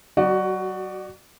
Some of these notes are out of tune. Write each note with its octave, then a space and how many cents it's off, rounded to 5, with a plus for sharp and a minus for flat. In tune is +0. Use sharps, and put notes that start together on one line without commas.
F#3 +40 F#4 +10 D5 +30